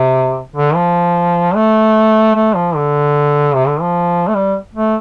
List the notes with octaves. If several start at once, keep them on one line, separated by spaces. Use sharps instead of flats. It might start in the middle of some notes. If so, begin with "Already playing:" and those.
Already playing: C3
D3
F3
A3
A3
F3
D3
C3
D3
F3
A3
G3
A3